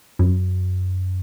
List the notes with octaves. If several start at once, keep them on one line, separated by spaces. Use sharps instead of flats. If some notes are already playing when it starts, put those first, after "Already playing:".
F#2